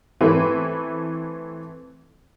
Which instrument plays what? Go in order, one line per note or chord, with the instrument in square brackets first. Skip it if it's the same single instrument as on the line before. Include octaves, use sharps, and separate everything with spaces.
[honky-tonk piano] E3 A3 C4 E4 B4